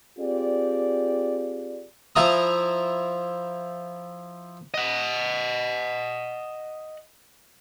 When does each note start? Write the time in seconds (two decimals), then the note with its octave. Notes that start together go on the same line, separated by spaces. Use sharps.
0.19 C4 F4 G4 G#4 D5
2.16 F3 E4 A#5 D#6
4.74 D#5 F#5